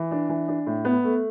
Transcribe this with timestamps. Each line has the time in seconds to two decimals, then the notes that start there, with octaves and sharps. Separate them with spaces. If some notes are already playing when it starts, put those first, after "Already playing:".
Already playing: E3
0.11 D4
0.29 E3
0.48 D4
0.66 A2
0.85 B3
1.04 A3